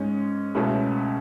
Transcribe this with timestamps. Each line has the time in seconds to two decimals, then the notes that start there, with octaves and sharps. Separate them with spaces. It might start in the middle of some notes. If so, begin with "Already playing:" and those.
Already playing: G#2 G#3 C#4
0.55 C#2 B2 A3 C#4 E4